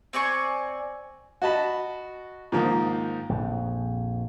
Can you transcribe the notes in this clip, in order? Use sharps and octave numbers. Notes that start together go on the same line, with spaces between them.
C4 D5 G#5 C#6
F#4 D#5 A5 B5
G#2 D#3 F3 A#3
A#1 F2